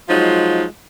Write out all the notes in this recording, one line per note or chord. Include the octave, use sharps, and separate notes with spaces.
F3 F#3 G#3 D#4 F4